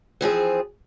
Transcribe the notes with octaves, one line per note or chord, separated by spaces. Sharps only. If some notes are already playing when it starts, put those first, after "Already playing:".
E3 F3 C4 G#4